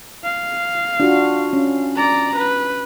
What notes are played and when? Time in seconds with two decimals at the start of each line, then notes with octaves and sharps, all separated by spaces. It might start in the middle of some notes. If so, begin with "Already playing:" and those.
0.24 F5
1.00 D4 F4 F#4
1.53 C#4
1.96 D5 A#5
2.36 B4